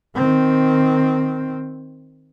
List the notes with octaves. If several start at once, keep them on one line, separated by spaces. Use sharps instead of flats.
D#3 C4